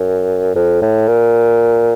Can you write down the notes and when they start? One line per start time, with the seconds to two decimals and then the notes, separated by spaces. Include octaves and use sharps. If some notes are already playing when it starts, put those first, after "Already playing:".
Already playing: F#2
0.56 F2
0.82 A2
1.08 A#2